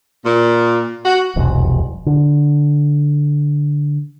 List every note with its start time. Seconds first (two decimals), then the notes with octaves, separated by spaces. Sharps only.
0.24 A#2
1.05 F#4
1.36 E1 C2 F2
2.06 D3